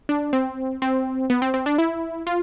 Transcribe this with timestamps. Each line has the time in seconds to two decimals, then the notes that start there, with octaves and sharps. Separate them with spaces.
0.09 D4
0.33 C4
0.82 C4
1.30 B3
1.42 C4
1.54 C4
1.66 D4
1.78 E4
2.27 F4